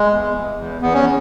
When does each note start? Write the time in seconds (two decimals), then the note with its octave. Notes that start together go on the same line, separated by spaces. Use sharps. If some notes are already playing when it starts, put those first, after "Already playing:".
Already playing: G#3
0.12 E2
0.35 E2
0.58 E2
0.82 E2 B3
0.94 C#4